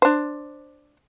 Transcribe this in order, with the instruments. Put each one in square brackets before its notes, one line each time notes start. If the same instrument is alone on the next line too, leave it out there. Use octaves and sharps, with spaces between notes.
[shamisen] D4 C5